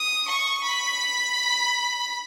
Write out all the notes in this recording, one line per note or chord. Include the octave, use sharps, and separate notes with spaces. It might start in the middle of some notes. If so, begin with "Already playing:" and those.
Already playing: D#6
C#6
B5